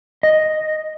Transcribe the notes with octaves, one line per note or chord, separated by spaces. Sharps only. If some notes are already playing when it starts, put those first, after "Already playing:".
D#5